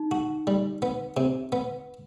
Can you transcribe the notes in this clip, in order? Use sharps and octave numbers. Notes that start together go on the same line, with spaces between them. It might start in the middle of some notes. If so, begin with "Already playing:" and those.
Already playing: D#4
F#4
G3
B3
C3
B3